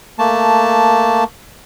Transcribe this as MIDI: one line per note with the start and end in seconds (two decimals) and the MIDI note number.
0.19 1.24 57
0.19 1.24 58
0.19 1.24 81